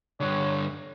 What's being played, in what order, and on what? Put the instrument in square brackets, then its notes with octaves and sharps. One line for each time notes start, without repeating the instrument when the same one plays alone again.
[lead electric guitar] G2 D3 [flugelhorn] C#5